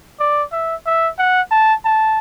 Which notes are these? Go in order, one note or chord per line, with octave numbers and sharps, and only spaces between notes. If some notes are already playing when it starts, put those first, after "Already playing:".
D5
E5
E5
F#5
A5
A5